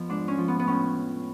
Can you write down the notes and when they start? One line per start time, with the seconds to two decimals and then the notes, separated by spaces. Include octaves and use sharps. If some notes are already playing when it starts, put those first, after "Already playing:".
Already playing: F2 F3 B3
0.09 G#2 D4
0.28 C#4
0.38 F3
0.48 B3
0.59 B3
0.67 A2 C#4